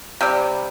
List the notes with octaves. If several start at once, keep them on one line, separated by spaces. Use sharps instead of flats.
C3 G3